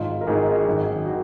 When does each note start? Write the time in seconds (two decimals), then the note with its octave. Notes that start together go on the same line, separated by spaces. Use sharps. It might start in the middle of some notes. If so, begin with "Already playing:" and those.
Already playing: G#1 G#2 D#3 F4
0.21 A#4
0.27 G#1 G#2 D#3 G#4
0.66 G#1 F#2 D#3
1.06 D#3 F#4